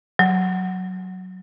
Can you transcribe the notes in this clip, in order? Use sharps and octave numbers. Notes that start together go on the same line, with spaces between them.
F#3